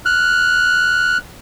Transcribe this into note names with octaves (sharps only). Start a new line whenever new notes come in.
F6 F#6